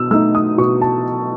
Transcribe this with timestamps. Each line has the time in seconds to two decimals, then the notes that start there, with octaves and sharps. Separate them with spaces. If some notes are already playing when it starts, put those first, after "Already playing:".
Already playing: B2 E6
0.11 A3 D#4 E6
0.35 D#6
0.58 B2 C#6
0.82 A5